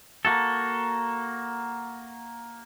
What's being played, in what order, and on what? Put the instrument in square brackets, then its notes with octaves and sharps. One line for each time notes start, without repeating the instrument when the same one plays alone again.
[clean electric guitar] A#3 F#4 A4